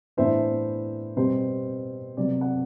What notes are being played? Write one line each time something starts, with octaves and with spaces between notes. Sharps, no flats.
A2 E3 B3 D4 C5 E5
B2 G3 C4 C5
C3 F#3 B3 D5
D5 F#5